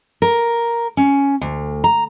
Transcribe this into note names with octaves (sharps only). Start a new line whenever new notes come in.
A#4
C#4
D2
A#5